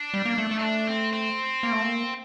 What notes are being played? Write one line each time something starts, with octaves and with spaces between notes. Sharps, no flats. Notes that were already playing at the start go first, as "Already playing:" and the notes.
Already playing: D4
G3
A#3
A3
A3
D#4
D4
C4
C4
A#3
A3
A#3